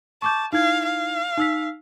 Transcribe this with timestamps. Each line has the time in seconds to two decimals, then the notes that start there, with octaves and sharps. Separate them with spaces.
0.22 A5 C#6 D6 G6
0.53 D#4 E4 F5 G#6
0.85 F5
1.38 D#4 E6 B6